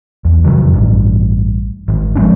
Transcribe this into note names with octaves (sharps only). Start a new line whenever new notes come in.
E2
F1 C3 D#3 F#3
A1 G2
G#1
F3 G#3 C4 D4